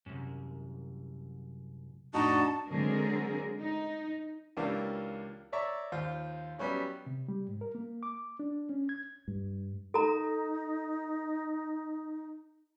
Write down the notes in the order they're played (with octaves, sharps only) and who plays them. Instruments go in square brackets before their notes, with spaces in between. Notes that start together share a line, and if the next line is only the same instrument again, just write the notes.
[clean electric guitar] C2 F#2
[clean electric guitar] F2 A2 [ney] D4 [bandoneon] D#4 F#4 D#5 [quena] A5
[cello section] D3 F#3 G#3 C4 G#4 A#4
D#4
[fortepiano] C#2 E3 A#3 D4 G4 F5
C#5 D5 E5 A#5 C#6
D#2 F4 C5
F#3 G3 B3 C#4 E4
[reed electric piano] C3
G3
G#2
A#4
A#3
D6
D4
C#4
G#6
[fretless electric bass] G2
[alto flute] D#4 [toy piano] A4 A#5